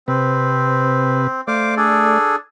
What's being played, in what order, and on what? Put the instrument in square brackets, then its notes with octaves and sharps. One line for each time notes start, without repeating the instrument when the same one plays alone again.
[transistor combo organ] C3 B4 [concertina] C4
[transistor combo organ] A3 D5 [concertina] C5 F5 D6
[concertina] D4 G#4 A4